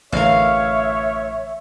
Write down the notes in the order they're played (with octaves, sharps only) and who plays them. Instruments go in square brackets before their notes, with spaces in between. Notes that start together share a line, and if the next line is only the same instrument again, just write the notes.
[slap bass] A1 D3 [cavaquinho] A#4 F5 [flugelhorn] C#5 [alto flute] E5